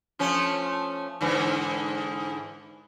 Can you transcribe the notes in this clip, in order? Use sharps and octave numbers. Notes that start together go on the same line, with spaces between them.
F3 A3 C#4
G#2 D3 E3